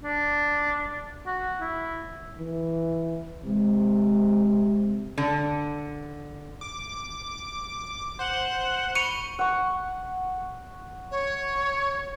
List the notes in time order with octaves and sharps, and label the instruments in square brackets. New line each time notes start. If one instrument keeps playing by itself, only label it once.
[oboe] D4
F#4
E4
[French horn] E3
[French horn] C3 [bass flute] G#3
[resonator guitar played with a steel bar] D3
[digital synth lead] D6
[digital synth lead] C5 [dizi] F#5
[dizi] B5 [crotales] C#6 G7 [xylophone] C#7 D#7 F7
[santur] F#5 C#6
[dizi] C#5